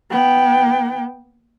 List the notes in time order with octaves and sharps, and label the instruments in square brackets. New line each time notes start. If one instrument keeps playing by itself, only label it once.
[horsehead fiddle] B3 G5